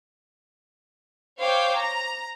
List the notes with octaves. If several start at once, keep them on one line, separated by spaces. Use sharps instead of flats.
C5 C#5 F5 G5 D6
A#5